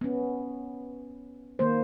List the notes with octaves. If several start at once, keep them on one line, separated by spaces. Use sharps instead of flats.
B3 C#4
D#3 A#3 C5